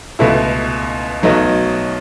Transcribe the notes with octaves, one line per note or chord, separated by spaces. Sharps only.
C#2 B2 A3 E4
B1 B2 F#3 A3 D#4